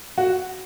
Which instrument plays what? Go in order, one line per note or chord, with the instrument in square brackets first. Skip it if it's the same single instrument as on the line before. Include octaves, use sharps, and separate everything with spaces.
[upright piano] F#4